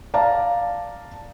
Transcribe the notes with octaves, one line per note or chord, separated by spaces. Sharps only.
D5 F5 A5 A#5